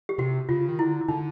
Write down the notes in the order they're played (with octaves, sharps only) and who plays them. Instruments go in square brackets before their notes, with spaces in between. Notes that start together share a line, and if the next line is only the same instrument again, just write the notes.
[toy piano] G4
[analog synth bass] C3 [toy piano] F#4
[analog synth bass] C#3 [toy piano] F4
[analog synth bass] D#3
[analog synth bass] D3 [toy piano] E4
[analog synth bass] D3 [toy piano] D#4